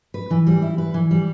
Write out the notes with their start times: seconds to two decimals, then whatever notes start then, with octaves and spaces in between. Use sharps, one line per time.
0.14 B4
0.30 E3
0.47 G3
0.62 E4
0.78 B4
0.94 E3
1.11 G3